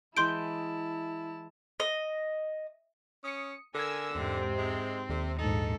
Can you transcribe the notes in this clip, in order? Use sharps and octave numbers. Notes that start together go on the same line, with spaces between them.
E3 G#3 E4 G5 A5 C6 G6 D7
D#5
C#4 D#6 C#7
D3 A4 A#4 G#5 E6 G#6
E2 G#2 C3 C4
G#3
D#2 C3
A#1 G#2 D#4 A4